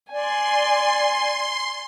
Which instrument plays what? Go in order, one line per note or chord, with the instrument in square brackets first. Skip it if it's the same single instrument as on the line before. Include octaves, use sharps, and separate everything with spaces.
[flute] D5 [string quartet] G#5 [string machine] C6